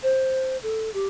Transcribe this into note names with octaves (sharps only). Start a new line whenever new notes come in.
C5
A4
G4